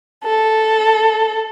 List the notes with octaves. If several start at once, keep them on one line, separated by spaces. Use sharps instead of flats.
A4